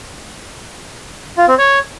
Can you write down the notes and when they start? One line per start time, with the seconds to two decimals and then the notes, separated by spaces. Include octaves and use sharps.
1.37 F4
1.48 C4
1.58 C#5